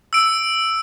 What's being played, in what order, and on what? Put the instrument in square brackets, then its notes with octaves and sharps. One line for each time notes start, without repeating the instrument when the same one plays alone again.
[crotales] E6 D7